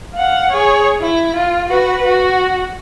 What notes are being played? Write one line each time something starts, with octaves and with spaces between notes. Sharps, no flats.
F5 F#5
G#4 C#5
E4
F4
F#4 B4
F#4